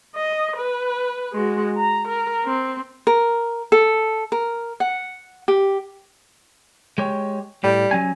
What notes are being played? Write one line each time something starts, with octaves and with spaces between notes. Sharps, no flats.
D#5
B4
G#3 F#4
A#5
A#4
C4
A#4
A4
A#4
F#5
G4
G#3 G4 C#5
A2 G3
F#3 C#4 G#5